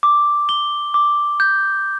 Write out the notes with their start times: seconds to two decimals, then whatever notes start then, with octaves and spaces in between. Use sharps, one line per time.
0.03 D6
0.49 G7
0.94 D6
1.40 G6